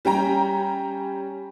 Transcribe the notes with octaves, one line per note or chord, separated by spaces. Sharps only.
G3 C#4 G5 A#5